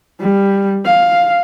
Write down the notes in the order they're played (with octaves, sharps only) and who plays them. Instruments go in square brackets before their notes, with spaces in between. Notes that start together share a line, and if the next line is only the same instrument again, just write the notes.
[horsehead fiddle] G3
F5